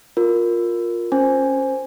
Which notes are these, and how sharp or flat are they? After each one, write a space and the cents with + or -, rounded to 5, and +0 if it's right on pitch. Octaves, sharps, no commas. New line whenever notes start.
F4 +15 A#4 +0
C#4 -15 C5 +0 G#5 +0